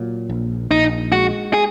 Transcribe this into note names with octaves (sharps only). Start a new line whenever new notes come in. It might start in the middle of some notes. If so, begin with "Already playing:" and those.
Already playing: A#2 F#3
A#1
A#1 D#4
G#3 F#4
G#4